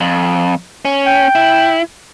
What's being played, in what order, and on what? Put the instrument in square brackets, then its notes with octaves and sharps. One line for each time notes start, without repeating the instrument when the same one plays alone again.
[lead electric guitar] F2
C#4
[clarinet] G5
[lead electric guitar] E4